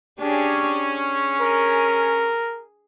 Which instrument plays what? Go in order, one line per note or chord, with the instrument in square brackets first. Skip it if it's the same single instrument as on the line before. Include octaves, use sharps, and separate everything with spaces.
[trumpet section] C#4 [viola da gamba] D4 G4 G#4
[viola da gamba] G#4
[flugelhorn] A#4